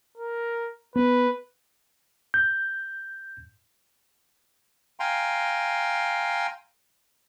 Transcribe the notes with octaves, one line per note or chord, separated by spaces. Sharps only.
A#4
B3 B4
G6
F5 G5 G#5 A#5 C6